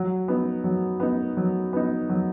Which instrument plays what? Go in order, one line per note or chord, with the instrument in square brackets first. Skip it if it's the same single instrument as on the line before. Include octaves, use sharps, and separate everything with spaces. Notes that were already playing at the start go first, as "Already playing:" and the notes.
Already playing: [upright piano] F#3
B3 D#4
F#3
B3 D#4
F#3
B3 D#4
F#3